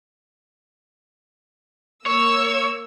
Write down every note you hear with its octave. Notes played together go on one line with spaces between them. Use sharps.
A#3 C#5 E6